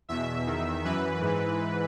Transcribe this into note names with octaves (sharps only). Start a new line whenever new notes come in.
E2 B2 E5
E2 D#3
F#2 E3 B4
G#2 E3